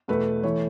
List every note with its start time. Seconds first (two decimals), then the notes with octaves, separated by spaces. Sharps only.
0.08 E2 B2 A3 B4
0.43 E3 A3 C#5